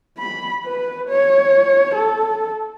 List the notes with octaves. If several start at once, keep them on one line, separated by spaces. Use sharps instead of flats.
B5
B4
C#5
A4